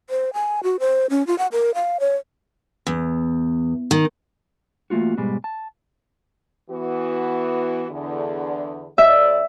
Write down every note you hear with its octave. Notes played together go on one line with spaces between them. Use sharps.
C5
G#5
F#4
C5
C#4
F4
F#5
A#4
F5
C#5
E2
D#3
E2 A3 A#3 F4 F#4
G#2 B2 G3 G#3
A5
E3 B3 F#4
E2 D3
D2 D5 E5